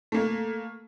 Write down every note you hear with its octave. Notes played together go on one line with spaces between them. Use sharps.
A3 A#3